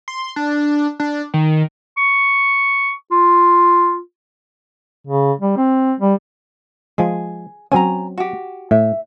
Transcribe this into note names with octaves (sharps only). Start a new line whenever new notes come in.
C6
D4
D4
D#3
C#6
F4
C#3
G3
C4
G3
F3 G#3 G#4
F#3 C4 C#4 G#5 A#5
F#4 G4
A2 E5